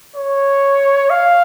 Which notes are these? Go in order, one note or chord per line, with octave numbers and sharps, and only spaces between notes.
C#5
F5